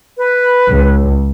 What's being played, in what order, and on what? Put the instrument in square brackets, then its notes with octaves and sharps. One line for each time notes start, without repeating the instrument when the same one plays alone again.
[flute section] B4
[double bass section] C#2